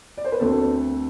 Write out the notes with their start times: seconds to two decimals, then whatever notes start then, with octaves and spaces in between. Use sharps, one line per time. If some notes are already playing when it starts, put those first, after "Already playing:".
0.17 D5
0.24 C5
0.32 B4
0.40 D2 D3 A3 C4 A4